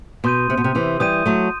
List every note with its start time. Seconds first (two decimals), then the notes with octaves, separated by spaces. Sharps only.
0.24 B2 C6 D#6 G6 D#7
0.50 C3
0.57 B2
0.64 C3
0.75 C3 E3
1.00 E3 G3 D#6 G6 D#7
1.26 F#3 A3